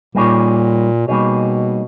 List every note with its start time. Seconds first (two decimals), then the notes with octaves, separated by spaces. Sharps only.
0.15 A#2 G3 A#3 D#4 G#4 C#5
1.07 B2 G3 A#3 D#4 G#4 C#5